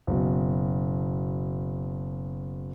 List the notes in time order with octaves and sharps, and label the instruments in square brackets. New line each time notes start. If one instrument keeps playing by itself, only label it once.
[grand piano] F#1 B2